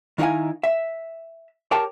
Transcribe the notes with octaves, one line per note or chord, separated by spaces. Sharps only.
D#3 D#4 E4 A4 F5 G#5
E5
G4 A#4 C#5 G5 A5